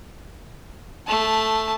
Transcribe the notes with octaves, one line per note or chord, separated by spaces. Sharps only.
A3 A5